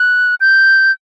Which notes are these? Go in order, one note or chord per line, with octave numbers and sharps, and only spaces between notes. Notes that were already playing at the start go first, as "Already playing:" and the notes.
Already playing: F#6
G6